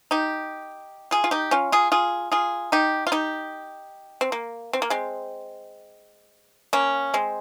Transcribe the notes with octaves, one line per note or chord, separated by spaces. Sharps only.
D#4 G4
F4 G#4
F4
D#4 G4
C#4 F4
F4 G#4
F4 G#4
F4 G#4
D#4 G4
F4
D#4 G4
C4
A#3
C4
A#3
G#3 C4
A#3 C#4
G#3 C4